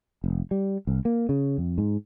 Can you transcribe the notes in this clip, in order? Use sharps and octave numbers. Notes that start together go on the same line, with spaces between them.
F1
G3
C2
A#3
C#3
F2
G#2